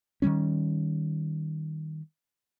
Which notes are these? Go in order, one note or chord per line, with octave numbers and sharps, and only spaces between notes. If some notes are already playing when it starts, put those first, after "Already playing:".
D#3 F#3 G3 C#4